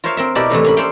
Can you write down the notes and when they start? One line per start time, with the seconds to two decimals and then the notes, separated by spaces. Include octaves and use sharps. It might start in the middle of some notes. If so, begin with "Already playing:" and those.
0.04 F4 A#4 C5 C#5 E5 F5
0.17 C4 A#4 E5
0.35 B2 E4 G4 A#4 D5 A5
0.50 A2 C3 E3 A3
0.64 A#3 C#4 B5
0.77 A4 C5 D5 E5 F5 G5